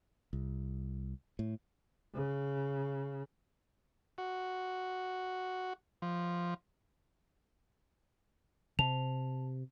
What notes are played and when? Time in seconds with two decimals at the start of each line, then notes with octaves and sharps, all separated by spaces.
0.33 C2
1.39 A2
2.15 C#3
4.18 F#4
6.02 F3
8.79 C3 A5 F7